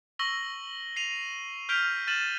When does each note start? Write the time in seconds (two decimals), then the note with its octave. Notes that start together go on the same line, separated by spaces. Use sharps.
0.19 C#6 E6 A#6 F#7 G7
0.96 C7 D#7 F7
1.69 F6 G6 B6 D7 F7 G7
2.07 F6 A6 D#7 E7 F#7